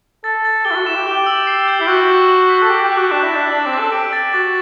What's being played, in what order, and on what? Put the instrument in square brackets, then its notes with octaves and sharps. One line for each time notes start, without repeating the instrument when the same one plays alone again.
[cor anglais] A4 [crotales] A6
[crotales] A6
[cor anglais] G4 [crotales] G7
[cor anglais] E4
F#4
[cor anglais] E4 [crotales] E7
[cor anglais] G4
[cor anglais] G4 [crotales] G7
[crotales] E6
C7
G6
[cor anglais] E4
[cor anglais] F#4 [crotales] G6
[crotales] G6
F#7
B6
[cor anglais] A4
[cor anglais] G4 [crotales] F#6
[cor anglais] G4
[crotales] F#6
[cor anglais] F#4
[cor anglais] D4 [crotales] E7
[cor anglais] E4
[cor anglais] D4 [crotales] A6
[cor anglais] D4 [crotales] F#7
[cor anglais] C4
[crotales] D6
[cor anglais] A4
[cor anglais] G4 [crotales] D7
[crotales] A6
[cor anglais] F#4 [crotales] A6